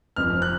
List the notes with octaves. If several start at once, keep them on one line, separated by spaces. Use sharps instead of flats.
F1 F2 F3 F6
F#6